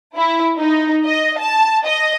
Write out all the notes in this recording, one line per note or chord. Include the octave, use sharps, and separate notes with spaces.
E4
D#4
D#5
A5
D#5